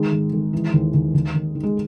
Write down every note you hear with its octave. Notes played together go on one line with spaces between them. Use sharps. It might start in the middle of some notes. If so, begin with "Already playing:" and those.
Already playing: D#3 G#3
G#1
G#1
E3
D#2
D#2
D#2
D#2
D#3
G#3